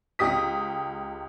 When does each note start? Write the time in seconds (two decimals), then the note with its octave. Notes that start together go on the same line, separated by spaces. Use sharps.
0.19 C#2 G4 D#6 B6